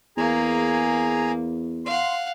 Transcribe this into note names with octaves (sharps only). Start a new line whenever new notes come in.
E2 A#3 G#4 G#5 A#5
F5 F#5 C6